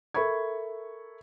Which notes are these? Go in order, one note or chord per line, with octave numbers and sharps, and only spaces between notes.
A4 A#4 E5 B5 C#6 G#6